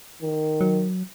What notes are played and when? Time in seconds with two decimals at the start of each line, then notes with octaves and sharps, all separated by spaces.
0.22 D#3
0.61 F#3